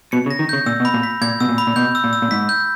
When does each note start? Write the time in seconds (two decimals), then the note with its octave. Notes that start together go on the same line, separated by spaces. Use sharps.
0.12 B2 C#7
0.26 C#3
0.31 A#6
0.39 D#3
0.49 C#3 G6
0.66 A#2 E6
0.80 B2
0.85 B5
0.94 A#2
1.03 B6
1.21 A#2 G#6
1.40 B2 E6
1.49 A#2
1.58 B5
1.67 A#2
1.76 B2 G6
1.95 E6
2.04 A#2
2.13 E6
2.22 A#2
2.31 G#2 B6
2.49 G6